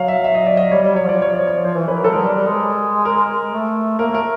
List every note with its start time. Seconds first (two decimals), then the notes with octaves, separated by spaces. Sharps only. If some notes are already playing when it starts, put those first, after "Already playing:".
Already playing: F#3 F5
0.08 E5
0.24 E5
0.35 D#5
0.46 D5
0.57 D#5
0.71 G3 C#5
0.82 G3 D5
0.95 F#3 C#5
1.06 F3 D5
1.22 C#5
1.34 D5
1.47 C#5
1.65 F3 C5
1.76 E3
1.88 B4
1.96 A#4
2.00 F#3 A4
2.11 G#3 A#4
2.24 G3
2.35 G3
2.47 G#3
3.05 A#4
3.52 A3
3.99 A#3 A#4
4.11 A3
4.14 A#4